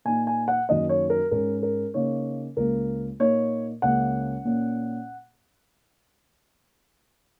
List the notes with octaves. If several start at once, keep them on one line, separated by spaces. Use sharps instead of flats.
A#2 A#3 D#4 G#5
G#5
F#5
F#2 D#3 A#3 D#5
C#5
A#4
G#2 G#3 C#4 A#4
A#4
C#3 A#3 D#4 C#5
C#2 C#3 A#3 A#4
A#2 A#3 D#4 C#5
C#2 C#3 A#3 C#4 F#5
A#2 A#3 C#4